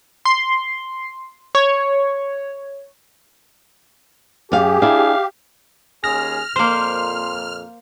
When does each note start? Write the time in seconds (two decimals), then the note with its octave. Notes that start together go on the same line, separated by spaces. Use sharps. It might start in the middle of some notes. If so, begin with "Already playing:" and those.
0.25 C6
1.55 C#5
4.52 F#2 G4 G#4 F5
4.82 D4 E4 F5
6.04 D#2 C#4 G#4 F6 A#6
6.56 F2 A#2 A#3 C5 C6